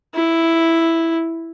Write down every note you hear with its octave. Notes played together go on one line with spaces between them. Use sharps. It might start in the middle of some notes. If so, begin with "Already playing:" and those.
E4